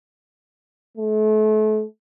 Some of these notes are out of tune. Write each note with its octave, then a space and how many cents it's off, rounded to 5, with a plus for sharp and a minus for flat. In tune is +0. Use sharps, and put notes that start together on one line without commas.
A3 -35